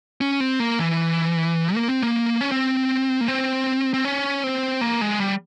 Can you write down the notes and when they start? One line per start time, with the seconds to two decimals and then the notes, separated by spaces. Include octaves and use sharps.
0.21 C#4
0.40 C4
0.60 A#3
0.79 E3
1.75 A#3
1.88 C4
2.02 A#3
2.41 C#4
2.52 C4
3.21 A#3
3.28 C4
3.94 C4
4.05 C#4
4.44 C4
4.81 A#3
5.01 G#3
5.20 G3